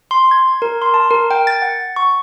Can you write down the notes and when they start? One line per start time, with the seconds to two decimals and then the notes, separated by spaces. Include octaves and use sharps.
0.11 C6
0.31 G#6
0.62 A#4
0.82 C6
0.94 A5
1.11 A#4
1.31 G5
1.47 A6
1.62 F#5
1.96 C#6